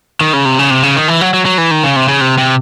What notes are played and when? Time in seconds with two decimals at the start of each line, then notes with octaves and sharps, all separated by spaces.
0.21 D#3
0.33 C#3
0.45 C3
0.59 C#3
0.70 C3
0.83 C#3
0.96 D#3
1.08 E3
1.21 F#3
1.34 F#3
1.45 F#3
1.58 E3
1.71 D#3
1.84 C#3
1.96 C3
2.08 C#3
2.21 C3
2.38 C3